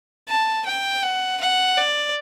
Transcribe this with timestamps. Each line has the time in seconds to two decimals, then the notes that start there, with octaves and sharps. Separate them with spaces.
0.28 A5
0.66 G5
1.03 F#5
1.41 F#5
1.77 D5